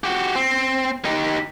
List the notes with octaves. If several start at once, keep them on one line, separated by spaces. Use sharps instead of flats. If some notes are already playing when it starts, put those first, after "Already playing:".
F#4 G4
C4
D#4 G4